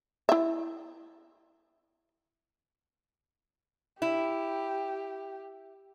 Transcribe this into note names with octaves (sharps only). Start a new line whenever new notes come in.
E4 E5
E4 G4